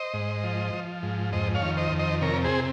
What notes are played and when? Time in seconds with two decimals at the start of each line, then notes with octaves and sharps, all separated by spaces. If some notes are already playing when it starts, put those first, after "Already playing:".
Already playing: C5 D#5
0.14 G#2
0.44 F3
0.73 F3
1.03 G#2
1.32 F2 C5 D#5
1.55 C#5 F5
1.62 D#3
1.77 C5 D#5
1.92 F2
1.99 C5 D#5
2.22 C3 A#4 C#5
2.44 G#4 C5